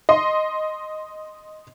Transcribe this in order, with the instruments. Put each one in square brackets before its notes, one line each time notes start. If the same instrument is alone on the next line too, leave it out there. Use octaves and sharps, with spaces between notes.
[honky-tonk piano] D#5 C6